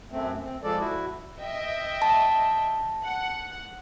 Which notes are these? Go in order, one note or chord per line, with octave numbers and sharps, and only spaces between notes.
F#2 A3 C4
C4
F3 G#3 A4 D5
E4 F#4
D#5 E5 G5
A5
F#5